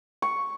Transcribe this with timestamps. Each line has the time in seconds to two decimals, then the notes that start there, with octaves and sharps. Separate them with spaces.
0.22 C#6